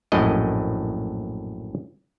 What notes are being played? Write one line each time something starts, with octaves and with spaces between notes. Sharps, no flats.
A#1 F#2 A2 D#5